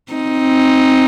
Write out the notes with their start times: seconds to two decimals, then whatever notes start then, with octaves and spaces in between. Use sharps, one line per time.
0.13 C4 D#4